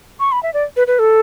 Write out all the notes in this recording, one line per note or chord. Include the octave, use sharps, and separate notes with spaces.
C#6
B5
E5
D5
B4
B4
A4